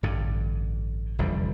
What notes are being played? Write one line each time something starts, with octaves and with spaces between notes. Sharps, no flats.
A1 G2 D3
F1 E2 D3 G3